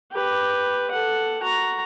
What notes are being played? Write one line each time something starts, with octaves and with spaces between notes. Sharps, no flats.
G4 B4
A4 F#5
F#4 A#5